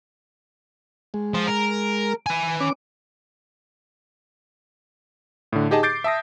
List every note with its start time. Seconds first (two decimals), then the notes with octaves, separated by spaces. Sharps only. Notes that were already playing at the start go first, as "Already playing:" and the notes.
1.14 G#3
1.34 F3
1.48 A#4
2.26 B4 G#5
2.61 C#4 D6
5.53 A2 D3
5.71 D#4 G4 G#4 D#5 A5
5.83 D6 G6 A6 C7 D7
6.04 E5 A5 D#6 A#6